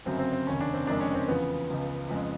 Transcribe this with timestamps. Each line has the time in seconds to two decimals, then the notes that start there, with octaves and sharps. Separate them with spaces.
0.05 G1 F#2 C#3 F#3 C4
0.19 C4
0.32 C4
0.47 F1 D#2 C#3 C#4
0.60 D4
0.73 C4
0.87 F#1 F2 C3 D#3 G#3 D4
1.00 C#4
1.14 C4
1.28 E2 C#3 F3 B3
1.69 C#2 C#3 F3
2.10 F2 C#3 F3 G#3